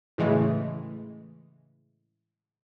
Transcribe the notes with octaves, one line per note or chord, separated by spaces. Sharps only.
A2 C#3 E3 G#3 A3